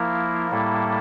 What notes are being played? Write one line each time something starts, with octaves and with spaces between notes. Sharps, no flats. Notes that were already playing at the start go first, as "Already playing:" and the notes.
Already playing: F3 A#3 E4 A#4
A2 G3 A#3 E4 A4